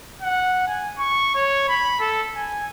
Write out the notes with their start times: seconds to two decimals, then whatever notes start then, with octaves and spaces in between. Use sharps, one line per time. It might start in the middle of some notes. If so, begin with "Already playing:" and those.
0.22 F#5
0.67 G#5
0.98 C#6
1.35 C#5
1.69 B5
2.00 A4
2.36 G#5